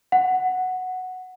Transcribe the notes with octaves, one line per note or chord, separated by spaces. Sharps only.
F#5